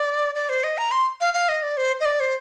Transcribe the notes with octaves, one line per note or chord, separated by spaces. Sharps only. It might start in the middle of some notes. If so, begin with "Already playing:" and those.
Already playing: D5
D5
C5
D#5
A#5
C6
F5
F5
D#5
D5
C5
D#5
D5
C5